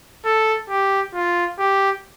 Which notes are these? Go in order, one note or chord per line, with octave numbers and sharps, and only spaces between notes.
A4
G4
F4
G4